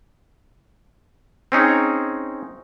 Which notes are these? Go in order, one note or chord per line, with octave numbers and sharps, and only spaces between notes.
C4 C#4 D#4 G#4